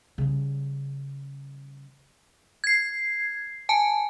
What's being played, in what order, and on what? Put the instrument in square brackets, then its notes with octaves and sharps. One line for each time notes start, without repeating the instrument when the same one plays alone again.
[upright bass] C#3 G3
[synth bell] G#6 C7
G#5 A5